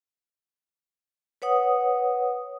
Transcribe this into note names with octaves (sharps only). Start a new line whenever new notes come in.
B4 C#5 F#5 D#6